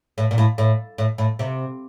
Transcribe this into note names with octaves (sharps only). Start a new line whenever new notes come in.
A2
A#2
A2
A2
A2
A2
C3